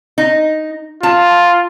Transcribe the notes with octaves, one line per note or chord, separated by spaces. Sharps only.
D#4
F4 A5